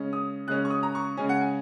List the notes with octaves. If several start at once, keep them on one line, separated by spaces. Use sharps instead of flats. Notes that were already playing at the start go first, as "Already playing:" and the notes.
Already playing: C#3 G#3 C#4
D#6
C#3 G#3 C#4 F#6
C#6
D#6
A#5
C#6
C#3 G#3 C#4 G#5
F#5
G#5